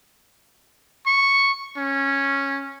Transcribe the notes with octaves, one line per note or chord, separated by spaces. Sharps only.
C#6
C#4